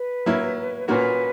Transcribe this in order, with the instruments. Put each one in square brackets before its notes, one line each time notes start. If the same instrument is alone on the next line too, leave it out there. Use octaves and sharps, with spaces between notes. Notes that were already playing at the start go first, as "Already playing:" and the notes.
Already playing: [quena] B4
[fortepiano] F#3 A#3 E4
[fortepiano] A#2 A#3 C#4 F#4 A#4 [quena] B4